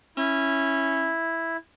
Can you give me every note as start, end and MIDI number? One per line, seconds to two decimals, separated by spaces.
0.17 1.11 61
0.17 1.57 64